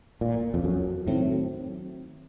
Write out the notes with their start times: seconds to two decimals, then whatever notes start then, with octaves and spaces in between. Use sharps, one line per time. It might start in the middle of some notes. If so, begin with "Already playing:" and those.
0.21 A#2
0.54 F2
0.64 F#2
1.07 A2 D#3 F#3 C4